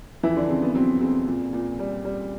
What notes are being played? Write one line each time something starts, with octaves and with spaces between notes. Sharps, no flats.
F2 E3 E4
D3 D4
C#3 C4
B3
F#3 C4
C#3 C4
A#2
A#2
G3
G3